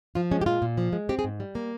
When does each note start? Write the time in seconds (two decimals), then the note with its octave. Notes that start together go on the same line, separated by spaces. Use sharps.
0.15 F3 F4
0.31 G#3 C#4
0.41 G4
0.46 A#2 F4
0.62 A#2
0.78 F3
0.93 G#3
1.09 C4 G4
1.19 G#4
1.24 G#2
1.40 G3
1.55 A#3